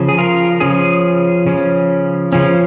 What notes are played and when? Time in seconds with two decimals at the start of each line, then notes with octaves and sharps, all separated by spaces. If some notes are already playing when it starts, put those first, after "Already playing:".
Already playing: C#3 F3 C#4
0.09 G#4
0.18 F4 A#4
0.60 C#3 F3 C#4 G#4
1.47 C#3 F3 C#4
2.32 C#3 F3 C#4